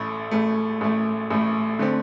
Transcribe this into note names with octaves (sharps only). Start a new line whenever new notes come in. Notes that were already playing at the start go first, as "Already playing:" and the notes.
Already playing: A1 A2 A3
A1 A2 A3
A1 A2 A3
A1 A2 A3
D3 A3 C4